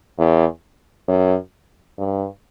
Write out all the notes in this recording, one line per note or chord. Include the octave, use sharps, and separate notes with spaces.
E2
F#2
G2